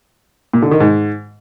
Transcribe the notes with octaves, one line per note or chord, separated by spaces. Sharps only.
A#2
D3
D#3
G#2